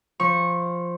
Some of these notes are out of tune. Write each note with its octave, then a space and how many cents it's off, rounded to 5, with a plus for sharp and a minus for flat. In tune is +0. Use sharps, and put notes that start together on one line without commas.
F3 +0 C#6 -15